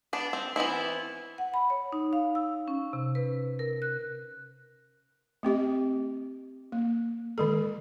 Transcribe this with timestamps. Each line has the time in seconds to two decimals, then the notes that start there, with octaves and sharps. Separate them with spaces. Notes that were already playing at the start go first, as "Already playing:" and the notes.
0.13 B3 D4
0.33 C4
0.56 E3 B3 C4 E4
1.38 F#5
1.54 B5
1.70 C#5
1.92 D#4
2.13 F5
2.35 E6
2.68 C#4
2.93 C3
3.15 B4
3.59 A#4
3.82 F#6
5.43 A3 C4 G4 D#5
6.72 A#3
7.38 D#3 G#3 A4